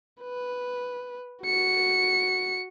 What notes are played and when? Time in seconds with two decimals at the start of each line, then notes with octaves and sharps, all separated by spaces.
0.22 B4
1.44 F#4 C#7